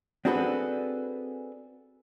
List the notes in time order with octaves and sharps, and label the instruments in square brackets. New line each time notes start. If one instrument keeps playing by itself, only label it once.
[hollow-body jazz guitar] C4 D4 F#4 G#4 A4 B4